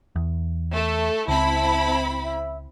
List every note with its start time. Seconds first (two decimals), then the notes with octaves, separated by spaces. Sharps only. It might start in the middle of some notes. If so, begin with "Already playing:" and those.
0.16 E2
0.73 A3 A4
1.28 C#2 C4 E4 A5 B5
2.24 E5